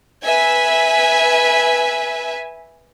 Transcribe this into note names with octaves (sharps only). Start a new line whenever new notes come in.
B4 E5 G#5